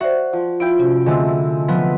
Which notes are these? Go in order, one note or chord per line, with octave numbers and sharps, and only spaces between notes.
F#4 C5 D5 E5
F3
F3 E4 G5 D7
C3 C#4 F#4
D3 G#3 A3 C4
F3 B3 B6